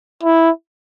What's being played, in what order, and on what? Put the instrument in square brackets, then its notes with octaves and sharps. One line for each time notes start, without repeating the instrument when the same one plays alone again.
[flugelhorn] E4